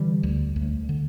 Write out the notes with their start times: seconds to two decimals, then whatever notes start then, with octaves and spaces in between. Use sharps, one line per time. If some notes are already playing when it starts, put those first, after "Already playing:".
Already playing: D3 E3 G3
0.23 D2
0.56 D2
0.89 D3